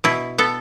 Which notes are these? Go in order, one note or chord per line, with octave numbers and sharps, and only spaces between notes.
B2 E4
B3 A4